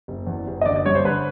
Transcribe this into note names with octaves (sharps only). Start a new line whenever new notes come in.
F#1
E2
F#1
D#5
D3 D5
D5
G2 C#5
C5
D3 B4